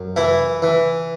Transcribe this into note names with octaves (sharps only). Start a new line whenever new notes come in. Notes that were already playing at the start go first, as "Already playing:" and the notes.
Already playing: F#2
E3 E4
E3